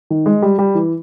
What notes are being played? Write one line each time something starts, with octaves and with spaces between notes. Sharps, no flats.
D#3
G#3
G3
G3
E3